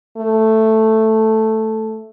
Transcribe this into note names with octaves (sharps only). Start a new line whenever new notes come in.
A3